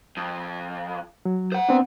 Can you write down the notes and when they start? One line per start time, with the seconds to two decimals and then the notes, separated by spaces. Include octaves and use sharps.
0.17 F2
1.25 F#3
1.52 C5 F#5
1.69 B3 C4 D4